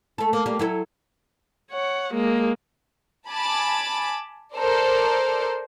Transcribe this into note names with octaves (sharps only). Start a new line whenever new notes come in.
A3 A4
A#3
G3 A#3
F#3 E4 A4
C#5 F#5
G#3 A#3
G#5 A5 B5 D6 A6
A4 A#4 C5 D5